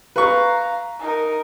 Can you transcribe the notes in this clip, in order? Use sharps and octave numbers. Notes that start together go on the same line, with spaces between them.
B4 F5 A#5 C#6
D#4 A#4